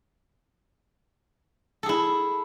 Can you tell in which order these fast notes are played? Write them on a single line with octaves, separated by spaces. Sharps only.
A4 G#4 E4